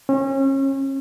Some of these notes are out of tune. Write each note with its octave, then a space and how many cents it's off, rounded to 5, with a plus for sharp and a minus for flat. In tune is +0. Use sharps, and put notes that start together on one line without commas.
C#4 -35